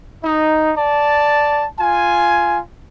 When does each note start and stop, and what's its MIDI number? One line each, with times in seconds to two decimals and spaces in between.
0.23 0.71 63
0.77 1.65 74
0.77 1.65 81
1.79 2.60 65
1.79 2.60 80